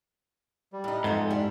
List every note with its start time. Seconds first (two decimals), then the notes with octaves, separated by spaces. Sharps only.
0.73 G3
0.84 A2 D#4
1.04 F2 G#2 A3 B3 D#4
1.30 G3 D4 E4